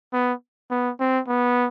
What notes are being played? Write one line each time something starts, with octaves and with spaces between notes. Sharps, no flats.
B3
B3
C4
B3